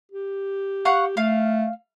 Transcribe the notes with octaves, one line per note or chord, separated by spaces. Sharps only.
G4
F5 F#5 C#6
A3 F5